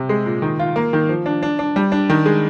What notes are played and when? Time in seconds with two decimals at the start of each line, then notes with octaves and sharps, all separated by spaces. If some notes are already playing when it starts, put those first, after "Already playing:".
Already playing: C3
0.09 G#3
0.26 A#2
0.42 D#3
0.59 F4
0.76 A#3
0.93 D#3
1.09 F3
1.26 D4
1.43 D4
1.59 D4
1.76 G3
1.92 D4
2.09 D#3
2.26 G#3